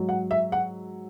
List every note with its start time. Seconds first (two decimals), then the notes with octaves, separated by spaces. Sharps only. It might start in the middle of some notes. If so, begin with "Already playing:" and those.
Already playing: G#2 F#3
0.09 F#5
0.31 E5
0.52 F#5